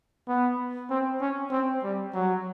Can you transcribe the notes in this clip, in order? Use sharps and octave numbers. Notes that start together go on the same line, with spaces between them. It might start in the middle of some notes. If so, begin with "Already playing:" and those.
B3
C4
C#4
C4
G3
F#3